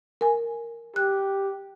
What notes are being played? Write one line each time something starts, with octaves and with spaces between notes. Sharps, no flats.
A#4 G#5
G4 F#6